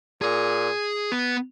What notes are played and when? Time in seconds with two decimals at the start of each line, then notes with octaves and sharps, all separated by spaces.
0.22 A#2 G#4
1.12 B3